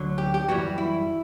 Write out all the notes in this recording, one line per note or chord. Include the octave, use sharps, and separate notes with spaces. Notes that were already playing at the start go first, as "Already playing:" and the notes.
Already playing: D2 D3 F#3
G4
G4
F#2 E3 G3 F#4
E4